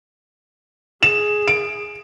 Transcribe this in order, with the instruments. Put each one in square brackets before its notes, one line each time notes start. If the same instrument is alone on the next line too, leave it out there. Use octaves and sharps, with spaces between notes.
[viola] G#4 [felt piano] E7
[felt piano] D7